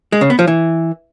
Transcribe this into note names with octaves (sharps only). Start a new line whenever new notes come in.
G#3
C#3
B3
F3
E3